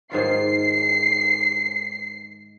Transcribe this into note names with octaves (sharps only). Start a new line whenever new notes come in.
G#2 D#3 F4 C7